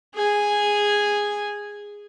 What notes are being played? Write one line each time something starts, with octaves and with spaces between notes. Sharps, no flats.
G#4 G#5